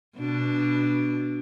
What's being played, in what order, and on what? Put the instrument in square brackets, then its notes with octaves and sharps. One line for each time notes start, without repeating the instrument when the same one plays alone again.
[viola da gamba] B2 D4